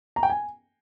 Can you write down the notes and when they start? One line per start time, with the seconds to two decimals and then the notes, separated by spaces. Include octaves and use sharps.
0.16 A#5
0.23 G5
0.30 G#5